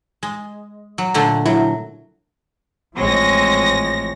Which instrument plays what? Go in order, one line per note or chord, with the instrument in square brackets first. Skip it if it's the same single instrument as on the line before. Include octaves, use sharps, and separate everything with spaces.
[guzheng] G#3
F#3
A#2 D3 A3
[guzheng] F#3 [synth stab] E4
[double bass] A1 F3 [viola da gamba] G#3 C4 C#5 [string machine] A#6